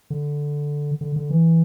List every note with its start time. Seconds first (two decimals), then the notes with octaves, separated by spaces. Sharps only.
0.10 D3
1.01 D3
1.16 D3
1.31 E3